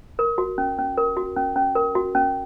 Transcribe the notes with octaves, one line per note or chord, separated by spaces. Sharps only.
A#4
F#4
C#4
C#4
A#4
F#4
C#4
C#4
A#4
F#4
C#4